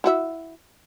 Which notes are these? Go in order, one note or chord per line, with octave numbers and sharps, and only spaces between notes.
E4 F#4 E5